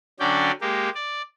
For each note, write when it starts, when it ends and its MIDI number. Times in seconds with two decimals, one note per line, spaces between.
0.20 0.51 50
0.20 0.51 54
0.20 0.51 61
0.20 0.51 74
0.20 0.51 79
0.61 0.90 56
0.61 0.90 58
0.61 0.90 67
0.95 1.22 74